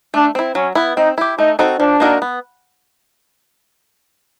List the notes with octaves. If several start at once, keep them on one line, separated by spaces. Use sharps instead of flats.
A3 D4
C4 E4
F#3 C#4
B3 E4
C4 D#4
E4 G4
A3 D#4
C4 D#4 F#4 A4
F3 D4
A#3 D#4 F#4 A#4
B3